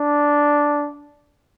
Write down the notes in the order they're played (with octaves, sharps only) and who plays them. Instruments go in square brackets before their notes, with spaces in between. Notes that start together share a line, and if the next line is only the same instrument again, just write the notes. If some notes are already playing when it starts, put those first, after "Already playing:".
Already playing: [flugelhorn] D4